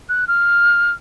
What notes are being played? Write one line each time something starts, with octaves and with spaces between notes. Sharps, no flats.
F#6
F6